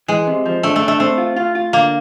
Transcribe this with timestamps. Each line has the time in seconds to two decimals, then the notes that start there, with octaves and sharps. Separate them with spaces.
0.08 E3 G#3
0.27 C3
0.46 F3
0.63 A3 D4
0.76 A3
0.82 D4
0.88 A3
1.00 A3 C4
1.18 F4
1.36 F4
1.55 F4
1.73 D3 A#3